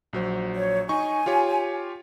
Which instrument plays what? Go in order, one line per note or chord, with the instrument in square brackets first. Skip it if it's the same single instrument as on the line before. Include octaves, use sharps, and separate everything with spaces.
[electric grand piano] A#1 F#3 C5
[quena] C#5
[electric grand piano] D#4 C#6 [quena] G#5
[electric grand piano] F4 G4 C#5